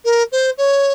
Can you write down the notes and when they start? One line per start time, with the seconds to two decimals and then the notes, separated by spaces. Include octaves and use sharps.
0.05 A#4
0.32 C5
0.58 C#5